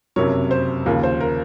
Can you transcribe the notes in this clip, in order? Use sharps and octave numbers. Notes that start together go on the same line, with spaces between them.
F#1 F2 C3 F#3 A#4 C#5
C5
D#2 C#3 F3 A#4
C5
A#4